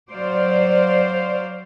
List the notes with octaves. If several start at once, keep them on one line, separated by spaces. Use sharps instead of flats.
F#3 C5 D5 F5